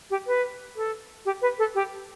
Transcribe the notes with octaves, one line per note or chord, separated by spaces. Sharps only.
G4
B4
A4
G4
B4
A4
G4